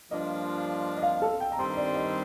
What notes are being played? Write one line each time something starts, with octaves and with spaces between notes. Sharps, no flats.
G2 F3 A#3 D4 F4 D#5
D#5
F5
A4
G5
A#5
G2 D#3 G3 C4 C6
D5
D#5